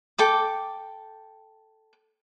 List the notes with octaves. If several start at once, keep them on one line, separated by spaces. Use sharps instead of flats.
A4 G5 D6